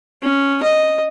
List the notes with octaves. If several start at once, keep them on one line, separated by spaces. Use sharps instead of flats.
C#4
D#5